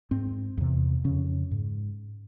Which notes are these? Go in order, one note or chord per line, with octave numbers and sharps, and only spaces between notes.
G#2 C4
E2 C3
F2 C#3 C#4
G#2